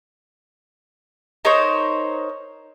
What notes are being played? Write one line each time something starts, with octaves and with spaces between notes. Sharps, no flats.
D#4 A#4 C5 C#5